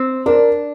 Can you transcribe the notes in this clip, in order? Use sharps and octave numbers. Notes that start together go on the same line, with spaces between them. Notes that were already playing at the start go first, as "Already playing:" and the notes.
Already playing: C4
D4 A#4 D5